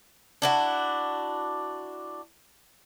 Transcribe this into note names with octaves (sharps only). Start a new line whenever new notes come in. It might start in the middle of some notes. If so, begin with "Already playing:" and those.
D4 E4 F#4